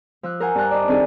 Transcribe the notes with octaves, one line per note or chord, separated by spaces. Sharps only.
F3 E6 F#6
A#4 C5 F#5 G#5
G2 D4 A5 A#5 F#6
D5 D#5
D#3 C4 D4 D#4 G#4 A4